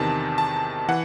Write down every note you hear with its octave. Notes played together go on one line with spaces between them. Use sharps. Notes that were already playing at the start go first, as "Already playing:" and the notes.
Already playing: E2 C3 D#3 A5
A5
E3 F#5